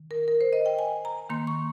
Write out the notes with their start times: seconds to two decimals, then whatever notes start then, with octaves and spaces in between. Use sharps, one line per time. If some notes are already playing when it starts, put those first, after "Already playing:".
Already playing: D#3
0.11 A#4
0.28 A#4
0.41 C5
0.53 D#5
0.66 G5
0.79 G#5
1.05 A#5
1.30 D#3 A#3 C6
1.47 C#6